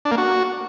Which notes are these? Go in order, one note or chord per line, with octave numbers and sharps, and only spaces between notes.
D4
A#3
F#4